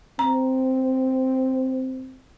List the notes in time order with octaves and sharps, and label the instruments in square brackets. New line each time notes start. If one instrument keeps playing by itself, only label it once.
[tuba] C4 [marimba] A#5